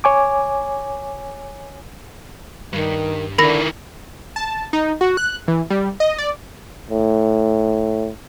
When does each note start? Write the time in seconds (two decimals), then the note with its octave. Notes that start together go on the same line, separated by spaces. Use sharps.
0.04 C#5 G#5 D6
2.73 G2 D#3
3.38 D3 D#3 E4 A#4 B5 A#6
4.36 A5
4.73 D#4
5.01 F#4
5.17 F#6
5.48 E3
5.70 G3
6.00 D#5
6.18 D5
6.90 A2